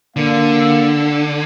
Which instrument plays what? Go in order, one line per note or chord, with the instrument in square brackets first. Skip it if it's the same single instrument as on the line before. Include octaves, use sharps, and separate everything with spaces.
[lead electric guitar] D3 [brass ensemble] A#3 F5